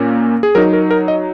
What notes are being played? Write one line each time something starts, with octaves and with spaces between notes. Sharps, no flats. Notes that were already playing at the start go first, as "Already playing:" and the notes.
Already playing: A#2 A#3 C#4
G#4
F#3 D#4 A#4
A#4
A#4
D#5